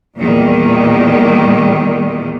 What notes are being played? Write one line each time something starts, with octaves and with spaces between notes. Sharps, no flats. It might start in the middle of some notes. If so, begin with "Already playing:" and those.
E2 A#2 D#3 G3